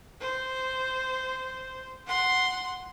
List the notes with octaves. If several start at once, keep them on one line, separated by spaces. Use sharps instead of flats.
C5
F#5 C6